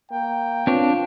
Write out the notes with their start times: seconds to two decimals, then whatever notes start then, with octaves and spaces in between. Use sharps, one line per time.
0.12 A#3 G5
0.67 C4 D4 F4 B4 C#5